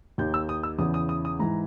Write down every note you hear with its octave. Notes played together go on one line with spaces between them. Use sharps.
D#2 D#3 G6
E6
D#6
E6
E2 C#3 E3 D#6
D#6
D#6
D#6
G#2 E3 A#5